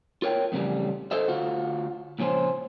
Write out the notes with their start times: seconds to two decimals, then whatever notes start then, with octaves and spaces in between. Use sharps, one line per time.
0.22 F4 A#4 C#5 G5
0.52 F2 A2 C#3 E3 G3
1.11 A4 C5 D#5 E5
1.28 D2 F4 F#4
2.19 C#2 A#2 F3 C#4 C5